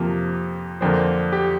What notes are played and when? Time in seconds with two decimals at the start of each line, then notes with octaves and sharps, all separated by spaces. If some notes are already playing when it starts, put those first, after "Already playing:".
Already playing: F2 C3 F3 A#3
0.81 F2 D3 A#3 C5
1.32 G4